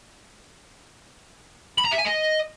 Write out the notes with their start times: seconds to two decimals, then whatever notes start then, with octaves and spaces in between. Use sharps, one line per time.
1.78 B5
1.85 A#5
1.92 E5
1.99 G#5
2.06 D#5